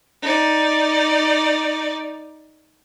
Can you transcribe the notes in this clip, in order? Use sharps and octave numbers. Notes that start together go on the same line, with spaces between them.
D#4 D5